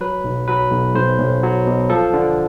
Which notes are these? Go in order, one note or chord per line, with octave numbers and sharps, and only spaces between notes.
F#3 B4
B1
F#3 B4
B1
B1 C5
B1
F#3
B2
F3 A4
D3